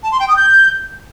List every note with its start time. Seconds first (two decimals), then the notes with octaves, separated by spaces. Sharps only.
0.03 A5
0.12 C6
0.20 G5
0.28 D#6
0.36 G6